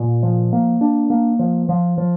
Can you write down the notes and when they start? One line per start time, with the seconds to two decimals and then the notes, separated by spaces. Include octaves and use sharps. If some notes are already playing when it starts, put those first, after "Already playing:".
Already playing: A#2
0.23 F3
0.53 A#3
0.81 D4
1.10 A#3
1.39 F3
1.69 F3
1.98 F3